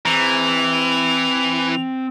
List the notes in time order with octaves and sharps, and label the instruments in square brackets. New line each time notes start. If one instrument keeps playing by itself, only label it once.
[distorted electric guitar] E3 [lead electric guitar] C4 A#5 [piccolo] F7